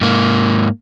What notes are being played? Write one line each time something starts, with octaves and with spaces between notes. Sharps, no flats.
G#2 A#3